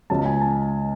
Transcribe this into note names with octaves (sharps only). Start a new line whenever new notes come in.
C#2 C#3 G#3 A5
G#5
A5